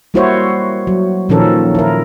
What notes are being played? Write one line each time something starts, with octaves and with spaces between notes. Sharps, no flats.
G3 A#3 E4 F#4 C5 C#5
F#3
A#2 D#3 F3 C#4 A4 A#4
E4 A#4